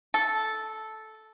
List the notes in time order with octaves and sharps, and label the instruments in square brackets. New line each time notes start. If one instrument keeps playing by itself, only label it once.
[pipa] A4